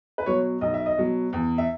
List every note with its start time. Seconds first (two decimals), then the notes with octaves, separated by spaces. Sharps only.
0.18 B4
0.26 B2 F#3 C#5
0.61 B1 D#5
0.74 E5
0.86 D#5
0.97 B2 F#3
1.33 E2
1.58 E5